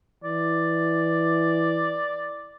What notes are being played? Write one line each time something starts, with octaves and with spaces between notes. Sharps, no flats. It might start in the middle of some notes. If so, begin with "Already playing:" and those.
E3 D5